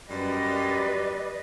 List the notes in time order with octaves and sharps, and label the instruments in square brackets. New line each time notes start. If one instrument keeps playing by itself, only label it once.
[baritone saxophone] F#2 [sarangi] G3 [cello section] B4 D#5 [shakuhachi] D5